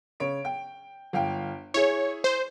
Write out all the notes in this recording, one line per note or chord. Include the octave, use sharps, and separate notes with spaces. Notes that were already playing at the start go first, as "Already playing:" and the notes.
C#3 C#5 D7
G5
G1 F5 G5
E4 G#4 C#5
C5